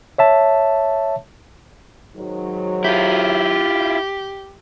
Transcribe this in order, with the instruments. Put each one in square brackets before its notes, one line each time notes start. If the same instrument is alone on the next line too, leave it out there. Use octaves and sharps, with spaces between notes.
[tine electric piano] C#5 E5 A5
[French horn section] G#2 D#3 F#3
[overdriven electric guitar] E4 F4 [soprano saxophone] G4